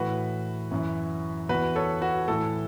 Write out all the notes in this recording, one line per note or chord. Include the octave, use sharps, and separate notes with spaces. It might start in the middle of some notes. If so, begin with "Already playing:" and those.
Already playing: A2 E3 F#4 B4
F#2 E3
E2 E3 F#4 B4
A4 C#5
F#4 B4
A2 E3 A4